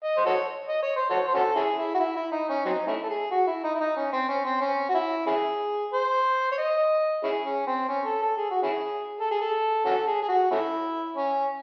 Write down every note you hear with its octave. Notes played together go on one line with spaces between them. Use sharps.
D#5
C5
F#4 A4 C#5
D#5
C#5
C5
F#4 A4 C#5
C5
C#4 F#4 A4
C#4 E4 G#4
E4
F#4
E4
E4
D#4
C#4
F#3 C4 D#4
A3 C#4 E4
A4
G#4
F#4
E4
D#4
E4
D#4
C#4
C4
C#4
C4
C#4
F#4
E4
C#4 E4 G#4
C5
C#5
D#5
C#4 E4 G#4
C#4
C4
C#4
A4
A4
G#4
F#4
C#4 E4 G#4
A4
G#4
A4
C#4 F#4 A4
G#4
G#4
F#4
A3 C#4 E4
C#4